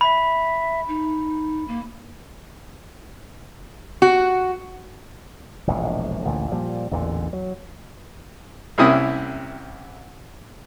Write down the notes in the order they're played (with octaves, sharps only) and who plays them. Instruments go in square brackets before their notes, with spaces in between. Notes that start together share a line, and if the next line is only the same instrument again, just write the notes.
[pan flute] E5 [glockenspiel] B5
[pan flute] D#4
A#3
[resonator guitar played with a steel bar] F#4
[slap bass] E1 A#1 A2 G#3
A1 D2 A#2
A#2 F3 G3
A1 E2 A#2 D3
F#3
[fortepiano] C2 C3 A#3 C#4 E4 D#6